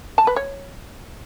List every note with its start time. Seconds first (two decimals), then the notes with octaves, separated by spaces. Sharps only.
0.18 A5
0.27 B4
0.36 C#5